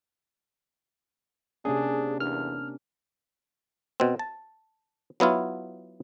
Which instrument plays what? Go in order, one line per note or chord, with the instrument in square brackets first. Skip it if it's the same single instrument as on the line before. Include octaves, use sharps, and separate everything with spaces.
[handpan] C3 A#3 C#4 [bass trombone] D4 [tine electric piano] G#4
[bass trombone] E2 [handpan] D4 A#4 [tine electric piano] F6
[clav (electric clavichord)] B2 C4
A5
F#3 B3 E4 F4